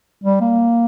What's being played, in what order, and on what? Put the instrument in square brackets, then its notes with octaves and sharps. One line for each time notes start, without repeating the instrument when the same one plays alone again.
[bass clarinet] G3
A#3